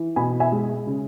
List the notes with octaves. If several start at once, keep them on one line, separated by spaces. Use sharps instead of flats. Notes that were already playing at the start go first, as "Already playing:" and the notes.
Already playing: E3
B2 G#5 B5
E5 G#5
G#3
C#3